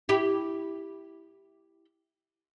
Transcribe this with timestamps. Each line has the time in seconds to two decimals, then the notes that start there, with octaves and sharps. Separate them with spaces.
0.09 E4 G4